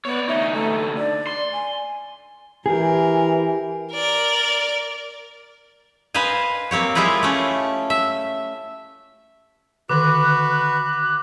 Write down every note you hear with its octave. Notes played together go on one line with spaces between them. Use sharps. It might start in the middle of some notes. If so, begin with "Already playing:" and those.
B3 C#5 D5
D2 D#4 E5
A3
D5
C6
G#5
E3 G4 G#4 A#4
A#4 D5
B4 C5 D#5 F5 G#5
A#3 C4 G4 C#5
G#3 E4 F4 G4 G#4 B4
A3 C#4
E5
D3 D#3 F#4 A4 B4 D6 F#6